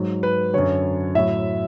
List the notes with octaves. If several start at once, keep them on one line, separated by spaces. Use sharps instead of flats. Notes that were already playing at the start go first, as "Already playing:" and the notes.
Already playing: G#2 F#3
B4
F#2 D3 F#3 C#5
A2 F#3 E5